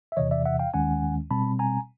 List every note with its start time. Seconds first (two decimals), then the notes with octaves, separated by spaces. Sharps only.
0.12 E5
0.17 E2 C3 E3 C#5 D#5
0.31 D5 E5
0.45 E5 F#5
0.59 F5 G5
0.74 D#2 D#3 G#3 C#4 F#5 G#5
1.31 B2 G3 C4 A5 B5
1.59 G#5 A#5